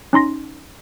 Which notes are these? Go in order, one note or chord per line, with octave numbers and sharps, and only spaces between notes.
C#4 D#4 C6 A#6